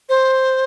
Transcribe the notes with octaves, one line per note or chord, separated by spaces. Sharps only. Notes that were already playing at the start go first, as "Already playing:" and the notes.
C5